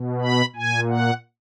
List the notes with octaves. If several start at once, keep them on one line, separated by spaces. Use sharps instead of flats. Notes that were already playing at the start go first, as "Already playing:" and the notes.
Already playing: B2
B5
A#2 G#5
F#5